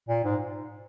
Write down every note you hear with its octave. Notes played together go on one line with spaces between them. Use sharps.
A#2
G#2